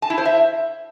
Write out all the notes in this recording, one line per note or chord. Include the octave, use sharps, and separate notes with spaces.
A5
E4
C5
E5